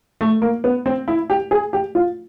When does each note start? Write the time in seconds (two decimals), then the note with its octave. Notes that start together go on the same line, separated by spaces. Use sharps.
0.21 A3
0.42 A#3
0.64 B3
0.86 C4
1.08 E4
1.30 G4
1.51 G#4
1.73 G4
1.95 F4